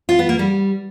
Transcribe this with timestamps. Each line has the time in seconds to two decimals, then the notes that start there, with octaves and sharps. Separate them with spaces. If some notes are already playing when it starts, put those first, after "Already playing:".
0.09 F4
0.19 B3
0.29 A#3
0.39 G3